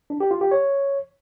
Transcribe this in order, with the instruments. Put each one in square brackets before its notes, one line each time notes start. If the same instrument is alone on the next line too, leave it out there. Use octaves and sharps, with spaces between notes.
[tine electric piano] D4
G4
F4
G4
C#5